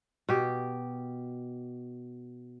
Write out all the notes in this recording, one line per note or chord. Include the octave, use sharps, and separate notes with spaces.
B2 G4